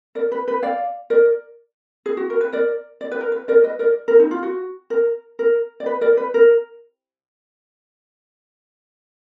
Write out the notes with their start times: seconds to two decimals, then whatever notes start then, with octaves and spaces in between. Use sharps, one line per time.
0.15 A#4 D5
0.32 B4
0.48 B4
0.62 D5 F5
1.10 A#4 D5
2.06 G#4
2.17 F#4
2.30 A#4
2.41 B4
2.52 A#4 D5
3.01 D5
3.11 B4
3.21 A#4
3.32 B4
3.48 A#4 D5
3.64 B4 D#5
3.79 A#4 D5
4.08 A#4
4.20 D#4
4.31 F4
4.43 F#4
4.90 A#4
5.39 A#4
5.80 D5
5.86 B4
6.01 A#4 D5
6.17 B4
6.34 A#4